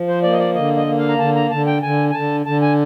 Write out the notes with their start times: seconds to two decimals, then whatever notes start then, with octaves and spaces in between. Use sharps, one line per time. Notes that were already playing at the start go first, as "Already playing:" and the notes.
Already playing: F3
0.08 C5
0.23 A#3 D5
0.33 D#5
0.39 D5
0.55 D3 D#5
0.76 D#5
0.86 A#3
0.98 F5
1.09 A#5
1.19 D3 A5
1.35 A#5
1.51 D3 A5
1.67 G5
1.82 D3 G#5
2.10 G#5
2.14 D3 A5
2.46 D3 A5
2.62 G#5